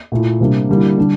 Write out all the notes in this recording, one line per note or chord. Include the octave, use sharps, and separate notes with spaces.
A#2 A3 E4
C3 G3 A#3 D4
D3 G3 A#3 E4
D3 G3 D4